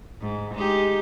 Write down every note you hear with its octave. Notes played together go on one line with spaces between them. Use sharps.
G#2
G#3 D#4 G4